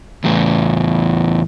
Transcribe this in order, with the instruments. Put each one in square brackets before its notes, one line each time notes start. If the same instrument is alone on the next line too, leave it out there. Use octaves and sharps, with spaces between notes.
[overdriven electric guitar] E2 A2